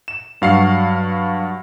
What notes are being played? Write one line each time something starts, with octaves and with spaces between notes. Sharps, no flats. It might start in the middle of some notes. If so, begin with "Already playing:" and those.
E7
G2 F#3 F5 F#5 C#6 C7